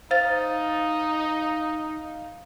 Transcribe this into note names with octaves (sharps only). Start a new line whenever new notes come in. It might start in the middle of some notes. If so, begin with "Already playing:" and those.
D#4 C5 F5 A6